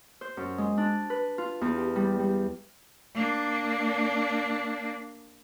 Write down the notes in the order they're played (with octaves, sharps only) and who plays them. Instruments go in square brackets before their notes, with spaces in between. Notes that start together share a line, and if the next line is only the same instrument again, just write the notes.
[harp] C5
F#2
G#3
D4
B4
F4
E2
G4
G3
G3
[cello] A#3 D4